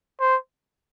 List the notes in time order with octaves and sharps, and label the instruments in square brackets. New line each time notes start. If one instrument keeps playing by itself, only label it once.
[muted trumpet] C5